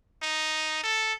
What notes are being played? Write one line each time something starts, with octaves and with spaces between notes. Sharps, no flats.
D#4
A4